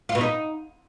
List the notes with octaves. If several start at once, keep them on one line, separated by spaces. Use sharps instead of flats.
F4
B2
D#4